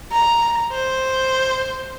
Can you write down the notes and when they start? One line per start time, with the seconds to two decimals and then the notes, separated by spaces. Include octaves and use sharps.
0.12 A#5
0.72 C5